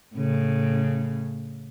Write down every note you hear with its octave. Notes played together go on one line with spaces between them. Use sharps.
A2 C#3